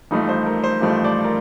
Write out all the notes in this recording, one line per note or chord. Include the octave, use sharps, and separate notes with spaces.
A1 G2 F3 A3 D#4
C5
A#4
C5
A1 G2 F3 A3
D5
A#4